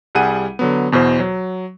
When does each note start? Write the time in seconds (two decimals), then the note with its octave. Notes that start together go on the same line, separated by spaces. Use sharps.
0.15 C2 G3 G#4 F#5 G#5 D#7
0.59 D3 F#3 B3
0.92 E2 B2 E3 C5
1.20 F#3